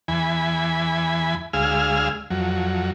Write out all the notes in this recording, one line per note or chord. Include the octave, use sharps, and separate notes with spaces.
E2 E3 G#5 B5
D2 G#3 G#4 F5 E6 F6
F2 F#3